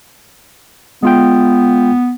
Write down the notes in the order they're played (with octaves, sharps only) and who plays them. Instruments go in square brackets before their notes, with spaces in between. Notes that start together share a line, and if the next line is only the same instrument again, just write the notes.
[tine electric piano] G#3 F4 G5 [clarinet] B3